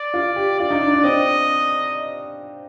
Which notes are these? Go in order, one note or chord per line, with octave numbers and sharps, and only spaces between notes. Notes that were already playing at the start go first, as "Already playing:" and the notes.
Already playing: D5
F4
G4
F4 D5
D#4
D4
D4
C4 D#5